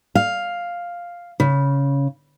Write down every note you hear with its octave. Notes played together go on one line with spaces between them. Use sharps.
F5
C#3